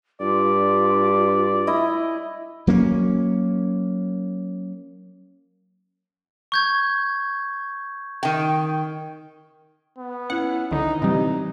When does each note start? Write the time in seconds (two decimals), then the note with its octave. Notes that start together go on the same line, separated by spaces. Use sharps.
0.21 G2 F4 D5
1.67 E4 D#5
2.67 F#3 A#3 C#4
6.52 C#6 G6 G#6
8.23 D#3 G5
9.98 B3
10.30 C#4 E4 B4 F#5
10.72 C#2 D3 D#4
11.02 A2 C3 E3 G3 D#4